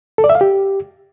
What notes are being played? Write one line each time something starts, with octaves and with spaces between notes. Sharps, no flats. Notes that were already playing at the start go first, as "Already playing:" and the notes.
A4
D5
E5
F5
G4